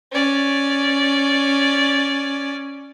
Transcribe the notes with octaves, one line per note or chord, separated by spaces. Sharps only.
C#4 D5